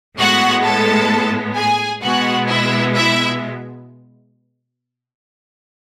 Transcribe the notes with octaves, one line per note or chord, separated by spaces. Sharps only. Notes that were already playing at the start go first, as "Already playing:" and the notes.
A2 G#3 B3 F#4 F#5
A4 A5
G#4 G#5
B2 G#3 B3 F#4 F#5
E4 E5
E4 E5